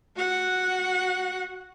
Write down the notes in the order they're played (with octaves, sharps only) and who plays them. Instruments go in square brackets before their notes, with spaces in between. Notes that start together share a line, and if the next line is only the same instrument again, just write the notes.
[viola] F#4 F#5